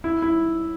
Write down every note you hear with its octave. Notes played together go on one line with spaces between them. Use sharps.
E4
E4